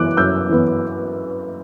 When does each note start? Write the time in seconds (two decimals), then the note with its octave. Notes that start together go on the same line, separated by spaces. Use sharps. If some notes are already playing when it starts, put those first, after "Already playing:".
Already playing: F#2 E3 B3 D6 F#6
0.17 F#2 E6 G6
0.49 E3 B3